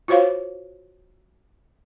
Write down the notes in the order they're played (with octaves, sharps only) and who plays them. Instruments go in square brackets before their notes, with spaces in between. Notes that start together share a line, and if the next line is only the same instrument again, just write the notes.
[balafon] F4 F#4 C5 C#5 F5